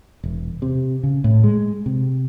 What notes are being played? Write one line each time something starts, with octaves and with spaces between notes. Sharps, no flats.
E1
C3
C#3
A2
G#3
C3